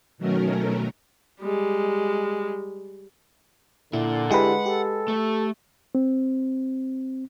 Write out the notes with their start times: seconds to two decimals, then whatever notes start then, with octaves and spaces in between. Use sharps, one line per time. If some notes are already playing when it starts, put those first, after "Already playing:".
0.18 B2 D#3 F#3 A3 C#4 A#4
1.40 G3 G#3
3.93 A#2 D3 E4
4.31 G#3 E4 G4 B4 F#5
4.66 G4 A4
5.08 A3
5.95 C4